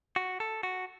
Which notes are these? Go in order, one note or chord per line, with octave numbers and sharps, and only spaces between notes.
F#4
A4
F#4